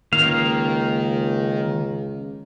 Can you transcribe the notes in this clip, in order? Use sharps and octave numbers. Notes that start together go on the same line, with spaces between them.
C#2 D#3 A#3 F5